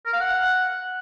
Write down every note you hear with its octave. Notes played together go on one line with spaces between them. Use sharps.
A#4
F5
F#5